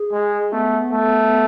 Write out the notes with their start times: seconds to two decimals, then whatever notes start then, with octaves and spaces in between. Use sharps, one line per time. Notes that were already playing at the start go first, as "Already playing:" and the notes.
Already playing: G#4
0.12 G#3
0.52 A3 B3
0.92 A3